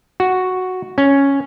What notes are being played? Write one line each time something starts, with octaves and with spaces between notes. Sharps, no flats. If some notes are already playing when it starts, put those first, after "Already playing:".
F#4
C#4